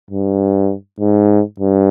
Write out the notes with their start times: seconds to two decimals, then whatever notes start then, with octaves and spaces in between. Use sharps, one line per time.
0.10 G2
1.00 G#2
1.60 G2